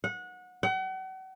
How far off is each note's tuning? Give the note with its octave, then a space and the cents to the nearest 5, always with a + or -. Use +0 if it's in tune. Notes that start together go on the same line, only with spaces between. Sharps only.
F#5 -25
F#5 +40